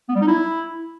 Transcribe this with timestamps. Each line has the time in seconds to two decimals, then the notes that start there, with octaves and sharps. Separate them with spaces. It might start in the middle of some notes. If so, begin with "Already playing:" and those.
0.09 B3
0.15 G3
0.21 D#4
0.28 E4